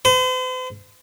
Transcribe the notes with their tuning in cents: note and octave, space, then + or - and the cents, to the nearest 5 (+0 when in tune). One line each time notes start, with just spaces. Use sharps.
C5 -45